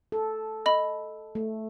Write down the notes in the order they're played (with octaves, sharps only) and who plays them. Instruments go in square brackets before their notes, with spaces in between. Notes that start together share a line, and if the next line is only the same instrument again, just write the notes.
[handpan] A4
[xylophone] D#5 B5
[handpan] A3